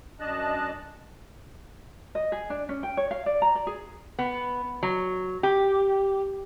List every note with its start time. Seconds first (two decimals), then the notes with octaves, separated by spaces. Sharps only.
0.20 F#2 D4 D#5 A5 F#6
2.15 D#5
2.32 G#4
2.50 D4
2.69 C#4
2.83 G5
2.97 C#5
3.11 F5
3.26 D5
3.42 A#5
3.55 D5
3.67 G#4
4.19 B3
4.83 F#3
5.43 G4